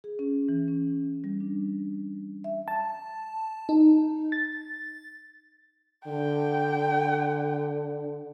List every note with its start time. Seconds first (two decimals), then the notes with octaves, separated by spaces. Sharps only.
0.04 G#4
0.19 C#4
0.49 E3
0.68 C#4
1.24 G3
1.40 D4
2.44 E5
2.68 A5
3.69 D#4
4.32 A6
6.07 D3 G5